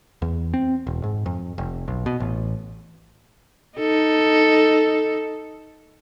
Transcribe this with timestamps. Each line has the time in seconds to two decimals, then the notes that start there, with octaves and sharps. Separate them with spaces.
0.22 E2
0.54 C4
0.87 E1
1.04 G#2
1.26 F2
1.58 F1
1.88 B1
2.06 B2
2.20 A1
3.77 D#4 A4